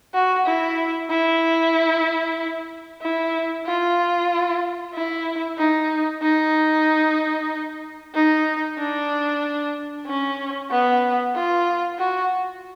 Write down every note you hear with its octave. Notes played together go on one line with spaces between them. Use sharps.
F#4
E4
E4
E4
F4
E4
D#4
D#4
D#4
D4
C#4
B3
F4
F#4